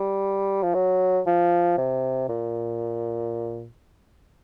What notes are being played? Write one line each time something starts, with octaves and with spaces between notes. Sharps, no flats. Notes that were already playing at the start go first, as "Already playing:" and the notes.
Already playing: G3
F3
F#3
F3
C3
A#2